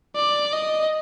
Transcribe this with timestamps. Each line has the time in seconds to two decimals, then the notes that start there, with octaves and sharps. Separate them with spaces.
0.16 D5
0.52 D#5